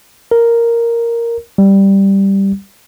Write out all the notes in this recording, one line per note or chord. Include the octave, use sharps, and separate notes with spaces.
A#4
G3